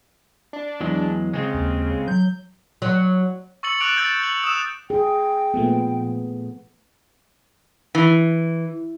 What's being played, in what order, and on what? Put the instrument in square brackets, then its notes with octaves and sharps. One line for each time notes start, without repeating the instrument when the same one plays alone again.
[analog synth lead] D4
[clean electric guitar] E2 F#3 G#3
[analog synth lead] C#3 [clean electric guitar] G#3 C4
[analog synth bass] D#2
[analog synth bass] F#3 [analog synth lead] G6
[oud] F#3
[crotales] C#6 E6 A6 C#7 F#7
D6 F#6 A6 D7 F7 F#7
D6 E6 G6 A6 F#7
G6 A6 F#7
D#6 E6 E7
[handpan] G#4 [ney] G5
[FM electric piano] A#2 F3 A3 [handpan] B3
[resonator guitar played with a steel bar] E3